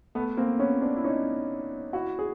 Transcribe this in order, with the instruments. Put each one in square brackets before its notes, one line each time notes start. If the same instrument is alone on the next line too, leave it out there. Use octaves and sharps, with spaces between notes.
[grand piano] A3 B3
A#3 C4
B3 C#4
C4 D4
E4
C#4 D#4
E4 F#4
G#4